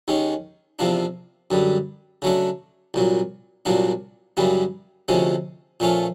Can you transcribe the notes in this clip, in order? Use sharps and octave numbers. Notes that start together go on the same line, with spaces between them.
D#2 D#3 G#3 C#4
E2 C3 F3 A#3 D4
F#2 D3 G3
C#3 F#3 A3 D4
C2 A#2 F#3
C2 A#2 F#3 A#3 D4
F#2 C#3 E3 G3 A#3
D2 C3 F3 G#3 C#4
A#2 F3 A3 C#4 F4